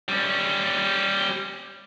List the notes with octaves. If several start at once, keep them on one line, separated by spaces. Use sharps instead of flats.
G3 C#4